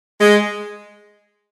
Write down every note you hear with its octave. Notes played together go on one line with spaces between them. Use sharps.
G#3